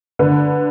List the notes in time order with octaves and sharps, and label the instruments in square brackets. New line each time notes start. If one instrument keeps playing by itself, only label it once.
[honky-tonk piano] D3 B4